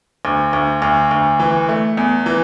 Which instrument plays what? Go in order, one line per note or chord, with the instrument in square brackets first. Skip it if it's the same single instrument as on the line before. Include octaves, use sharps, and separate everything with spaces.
[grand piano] D2
D2
D2
D2
E3
A3
E2
E3